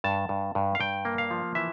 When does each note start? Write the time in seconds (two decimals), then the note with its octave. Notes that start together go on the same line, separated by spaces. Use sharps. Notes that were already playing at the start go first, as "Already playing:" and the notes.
0.04 G2 A5
0.29 G2
0.55 G2
0.75 F5
0.80 G2 G5
1.05 A#3
1.18 F5
1.31 F3
1.55 E3 E5